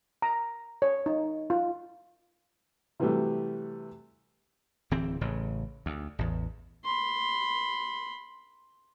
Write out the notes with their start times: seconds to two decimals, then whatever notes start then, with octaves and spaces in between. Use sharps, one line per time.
0.22 A#5
0.82 C#5
1.06 D#4
1.50 F4
3.00 C3 E3 F#3 G3 A3
4.91 D1 E3 C4
5.21 A1 A2 C#3
5.86 D2
6.19 A1 E2
6.84 B5 C6